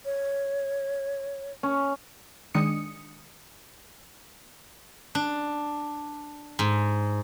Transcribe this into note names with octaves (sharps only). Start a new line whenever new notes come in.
C#5
C#4
D#3 G#3 D4 D#6 C#7
D4
G#2